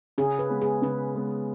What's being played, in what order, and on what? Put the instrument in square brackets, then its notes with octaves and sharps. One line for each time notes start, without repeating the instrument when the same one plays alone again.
[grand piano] C#3 [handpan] G#4
[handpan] B4
[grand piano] G#3 B3
[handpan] G#4
[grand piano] C#3 [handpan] B4
[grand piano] G#3 B3